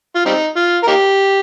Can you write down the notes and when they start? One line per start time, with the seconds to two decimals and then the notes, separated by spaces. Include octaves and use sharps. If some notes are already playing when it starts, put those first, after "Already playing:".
0.15 F4
0.25 G3 C4 D#4
0.56 F4
0.83 A#4
0.87 A#3 D#4 G4